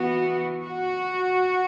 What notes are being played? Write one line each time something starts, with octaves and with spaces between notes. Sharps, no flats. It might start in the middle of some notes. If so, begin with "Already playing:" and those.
Already playing: E3 B3 F#4
F#4